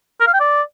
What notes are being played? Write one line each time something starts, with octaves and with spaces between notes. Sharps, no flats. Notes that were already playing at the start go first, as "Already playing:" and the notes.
A#4
F5
G5
D5